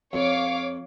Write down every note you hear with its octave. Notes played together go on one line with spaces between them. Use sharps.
F2 C#5 F5 D6